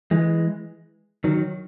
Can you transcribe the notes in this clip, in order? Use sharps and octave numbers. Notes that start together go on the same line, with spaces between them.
E3 G#3
D#3 F#3